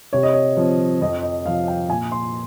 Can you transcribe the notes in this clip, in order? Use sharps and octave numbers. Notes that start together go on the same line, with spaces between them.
C3 C#5
D#5
C#5
F3 C4
F2 D#5
D#5
C3 F3 C4 F5
G5
A#2 G#5
C6